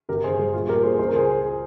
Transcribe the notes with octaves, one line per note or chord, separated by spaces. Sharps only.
G1 G4 A#4
G1 G#4 C5
G2 G#4 C5
A#1 F4 G#4
A#2 G4 A#4
A#2 G#4 C5
C#2 C5
A#4
G#4 C5